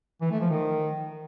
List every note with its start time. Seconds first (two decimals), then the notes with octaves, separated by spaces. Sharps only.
0.21 E3
0.31 A3
0.41 F3
0.50 D#3